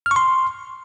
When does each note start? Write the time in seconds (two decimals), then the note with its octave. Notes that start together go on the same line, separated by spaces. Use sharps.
0.06 F6
0.11 C#6
0.16 C6